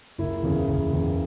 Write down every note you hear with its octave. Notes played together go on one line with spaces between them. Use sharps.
F#1 E4
E2 C#3
F#1
E2 C#3